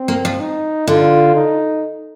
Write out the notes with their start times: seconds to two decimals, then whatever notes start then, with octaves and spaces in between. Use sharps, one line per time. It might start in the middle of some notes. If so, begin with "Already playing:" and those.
Already playing: C4
0.08 A#3
0.25 F3
0.40 D#4
0.87 D3 F4
1.35 D#4